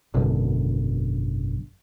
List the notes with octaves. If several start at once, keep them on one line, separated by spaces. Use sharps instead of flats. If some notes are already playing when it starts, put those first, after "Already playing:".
G#1 F#2 B2 D3